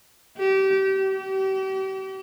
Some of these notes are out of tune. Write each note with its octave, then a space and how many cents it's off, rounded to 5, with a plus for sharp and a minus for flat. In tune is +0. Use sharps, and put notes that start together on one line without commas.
G4 -30
G4 -40